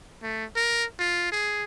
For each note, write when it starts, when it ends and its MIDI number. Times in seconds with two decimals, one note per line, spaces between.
0.22 0.45 57
0.56 0.85 70
0.99 1.27 65
1.32 1.64 68